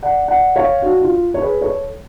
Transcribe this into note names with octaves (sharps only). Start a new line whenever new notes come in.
D5 F#5
D5 F#5
C#5 F5
D4 F#4
F4
C#5
G#4 B4
A4 C#5